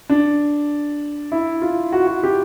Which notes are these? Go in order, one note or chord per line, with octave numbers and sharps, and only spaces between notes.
D4
E4
F4
F#4
F#4
G4